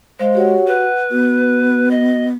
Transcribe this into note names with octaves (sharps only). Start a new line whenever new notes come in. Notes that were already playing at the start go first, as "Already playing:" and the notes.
G#3 C5 F5
F#4 G4 C#5 F#5
B4 F#5
B3 F#4
D#5